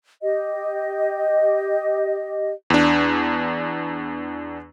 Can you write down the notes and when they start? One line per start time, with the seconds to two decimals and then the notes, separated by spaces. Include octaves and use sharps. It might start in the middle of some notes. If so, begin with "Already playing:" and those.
0.22 G4 D#5
2.70 E2 D4